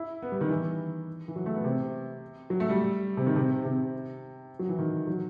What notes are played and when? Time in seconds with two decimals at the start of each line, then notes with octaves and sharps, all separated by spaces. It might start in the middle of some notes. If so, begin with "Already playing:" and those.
Already playing: E4
0.22 B3
0.32 G3
0.41 D#3
0.50 E3
1.28 E3
1.36 F#3
1.46 A3
1.55 B3
1.64 C3
2.50 F#3
2.60 A3
2.70 G3
3.17 C3
3.26 D#3
3.36 C3
3.65 C3
4.59 F#3
4.69 E3
4.79 D#3
5.07 F#3